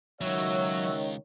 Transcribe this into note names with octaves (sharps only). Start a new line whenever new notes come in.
C#2 F#2 D#3 F#3 F#4 C#5 E5